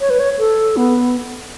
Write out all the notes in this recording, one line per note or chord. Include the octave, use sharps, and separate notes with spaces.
C#5
B4
C#5
A4
B3